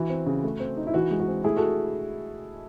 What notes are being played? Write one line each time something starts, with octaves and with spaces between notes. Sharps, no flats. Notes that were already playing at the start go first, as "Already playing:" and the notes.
Already playing: E3 F#4
C4
C#3
A3
C4
D#4
E4
E3 F#4
G#3
F#4
C4
A3 E4 G#4
F#4 A4